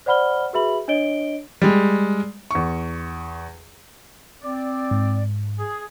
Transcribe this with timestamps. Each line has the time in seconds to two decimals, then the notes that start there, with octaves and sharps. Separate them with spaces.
0.06 C5 D5 F#5 B5 F6 G7
0.53 F#4 G#4 B4 E5 B5 F#7
0.88 D4 C#5 D#5 D7 G7
1.62 G3 G#3
2.51 E2 C#6
4.42 C4 D5
4.91 G#2
5.58 G#4